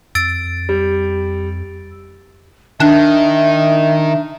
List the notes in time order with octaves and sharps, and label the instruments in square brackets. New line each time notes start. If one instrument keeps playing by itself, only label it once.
[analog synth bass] F2 [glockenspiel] E6 A6 D7
[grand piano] G3
[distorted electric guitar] D#3 [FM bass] D4 [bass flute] E5